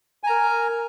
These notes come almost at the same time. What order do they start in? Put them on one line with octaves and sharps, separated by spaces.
G#5 A#5 A#4